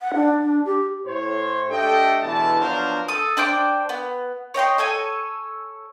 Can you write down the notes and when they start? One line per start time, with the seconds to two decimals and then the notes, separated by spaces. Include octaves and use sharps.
0.01 F#5
0.14 D4
0.42 D4
0.65 G4
1.06 A2 C5 C#5
1.70 A3 D4 G4 A4 D#5 G5
2.22 E2 B2 D3 E3 A5
2.60 F3 F#3 B3 D4 A#4 C5
3.08 A4 D#6
3.37 D4 C5 G5 D6
3.89 B3
4.54 C#5 D#5 G5 C6
4.78 A4 C#5 G#5